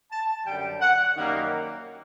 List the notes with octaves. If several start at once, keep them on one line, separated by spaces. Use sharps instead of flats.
A5
F#2 D3 G3 G5
F#5
F#2 D#3 G3 A#3